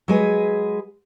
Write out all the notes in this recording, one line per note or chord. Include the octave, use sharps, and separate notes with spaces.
F#3 G#3 G#4 B4